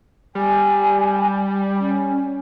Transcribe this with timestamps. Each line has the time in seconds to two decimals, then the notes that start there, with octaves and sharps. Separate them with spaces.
0.35 G3 G#5
1.79 C#4